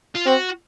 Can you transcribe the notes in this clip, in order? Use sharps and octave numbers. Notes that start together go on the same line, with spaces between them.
F4
C4 F#4